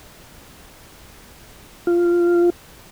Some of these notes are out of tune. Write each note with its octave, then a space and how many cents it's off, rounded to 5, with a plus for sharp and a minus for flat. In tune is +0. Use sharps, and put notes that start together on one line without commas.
F4 -10